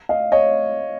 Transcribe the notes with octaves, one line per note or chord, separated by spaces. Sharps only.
D#5 F5
C#5 D#5